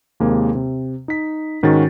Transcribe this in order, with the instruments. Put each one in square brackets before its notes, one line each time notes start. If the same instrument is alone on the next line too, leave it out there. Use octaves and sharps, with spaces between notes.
[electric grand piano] D#2 C3 G#3 A#3
C3
D#4 B6
G#2 D#3 C#4 F#4 A6